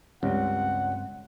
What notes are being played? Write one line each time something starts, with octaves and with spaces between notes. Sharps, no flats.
C#2 G2 G3 C4 F#5